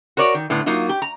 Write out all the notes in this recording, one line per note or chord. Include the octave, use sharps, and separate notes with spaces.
F#4 A#4 C#5 D5
D#3
A2 D3 B3
F#3 A#3 D#4 F4
G4
A#5